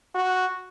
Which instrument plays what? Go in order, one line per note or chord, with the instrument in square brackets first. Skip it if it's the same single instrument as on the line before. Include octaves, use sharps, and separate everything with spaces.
[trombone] F#4